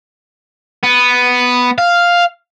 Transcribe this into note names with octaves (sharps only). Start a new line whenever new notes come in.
B3
F5